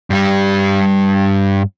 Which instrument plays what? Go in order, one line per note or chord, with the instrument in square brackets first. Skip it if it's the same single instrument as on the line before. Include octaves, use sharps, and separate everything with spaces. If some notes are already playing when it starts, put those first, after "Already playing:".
[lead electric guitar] G2 G3